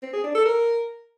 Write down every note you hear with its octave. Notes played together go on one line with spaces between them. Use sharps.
C4
G#4
D4
A4
A#4